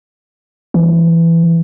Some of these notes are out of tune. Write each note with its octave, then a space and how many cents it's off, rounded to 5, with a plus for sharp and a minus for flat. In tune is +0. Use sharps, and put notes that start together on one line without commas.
E3 +15